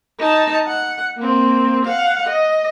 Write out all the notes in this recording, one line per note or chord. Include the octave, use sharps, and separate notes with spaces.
D#4 A5
F#5
A#3 C4
F5 F#5
D#5